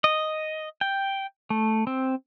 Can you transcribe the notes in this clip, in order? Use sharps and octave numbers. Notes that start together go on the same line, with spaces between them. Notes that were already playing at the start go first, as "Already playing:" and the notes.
D#5
G5
A3
C4